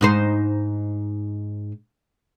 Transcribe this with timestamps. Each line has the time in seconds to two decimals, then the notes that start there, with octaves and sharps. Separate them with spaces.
0.01 G#2 D#4 C5